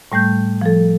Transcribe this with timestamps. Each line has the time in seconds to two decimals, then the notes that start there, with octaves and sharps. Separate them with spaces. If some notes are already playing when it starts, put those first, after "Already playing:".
0.12 A2 G3 A3 G6
0.61 F3 A4